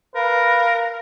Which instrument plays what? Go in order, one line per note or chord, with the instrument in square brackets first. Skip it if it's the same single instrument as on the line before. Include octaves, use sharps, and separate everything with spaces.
[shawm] A#4 [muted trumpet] B4 [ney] F5